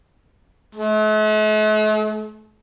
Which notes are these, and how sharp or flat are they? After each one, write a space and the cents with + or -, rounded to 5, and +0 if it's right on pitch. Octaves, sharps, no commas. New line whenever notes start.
A3 -45